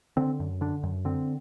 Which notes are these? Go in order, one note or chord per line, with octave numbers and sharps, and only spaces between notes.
D3 C4
F#2
D3 D4
F#2
D3 C4